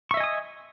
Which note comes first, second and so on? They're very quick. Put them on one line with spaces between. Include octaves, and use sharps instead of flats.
C#6 E5 D#5 G#5 D#6